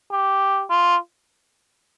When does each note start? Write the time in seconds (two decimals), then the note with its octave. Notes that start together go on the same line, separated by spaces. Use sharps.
0.12 G4
0.70 F4